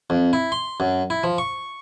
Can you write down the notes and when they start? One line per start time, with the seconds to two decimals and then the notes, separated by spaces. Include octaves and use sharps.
0.10 F2
0.33 E4
0.52 C6
0.80 F#2
1.10 E4
1.24 F3
1.38 C#6